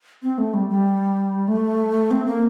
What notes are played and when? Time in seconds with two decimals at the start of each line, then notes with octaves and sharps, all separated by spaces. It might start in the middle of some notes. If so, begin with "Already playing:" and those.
0.23 C4
0.38 A3
0.54 G3
0.70 G3
1.48 A3
2.11 C4
2.26 A#3